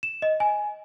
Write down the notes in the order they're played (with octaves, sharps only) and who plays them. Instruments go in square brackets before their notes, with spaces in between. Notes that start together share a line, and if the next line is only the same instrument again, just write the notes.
[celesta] E7
D#5
G#5